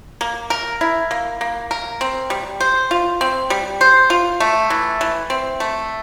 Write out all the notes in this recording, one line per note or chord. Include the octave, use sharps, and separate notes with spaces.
A#3
A#4
E4
A#3
A#3
A#4
C4
G3
C5
F4
C4
G3
C5
F4
A3
E3
E3
C4
A3